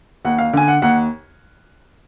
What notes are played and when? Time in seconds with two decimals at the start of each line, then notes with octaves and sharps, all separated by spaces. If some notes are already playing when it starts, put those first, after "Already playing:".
0.25 D#2 F#5
0.38 F5
0.53 D3 G#5
0.68 F#5
0.82 D#2 F#5